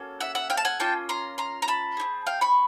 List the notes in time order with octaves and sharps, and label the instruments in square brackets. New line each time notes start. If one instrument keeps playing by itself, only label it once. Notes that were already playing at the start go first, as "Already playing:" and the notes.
Already playing: [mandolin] A#3 C#4 F#4 A4
E5 F#5
E5 F#5
F5 G5
A5
F#5 G#5
A#3 C#4 F4 G5 A5
A#5 C6
A#5 C6
A#5
A5 B5
C4 D#4 G#4
F5 G5
B5 C#6